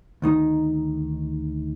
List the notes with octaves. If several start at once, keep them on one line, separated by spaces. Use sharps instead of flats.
D2 D#3 D#4